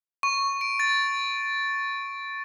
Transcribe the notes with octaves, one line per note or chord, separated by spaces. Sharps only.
C#6
D7
A6